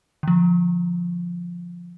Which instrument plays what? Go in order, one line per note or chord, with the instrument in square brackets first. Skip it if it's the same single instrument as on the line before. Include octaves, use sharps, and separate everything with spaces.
[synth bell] D3 F3